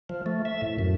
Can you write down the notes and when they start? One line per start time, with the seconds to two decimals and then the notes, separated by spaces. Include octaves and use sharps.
0.09 F3
0.26 A3
0.45 E5
0.62 A2
0.79 F#2